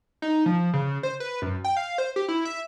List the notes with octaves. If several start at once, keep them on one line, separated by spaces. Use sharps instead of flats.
D#4
F3
C#3
C5
B4
F#2
G5
F5
C5
G4
E4
E5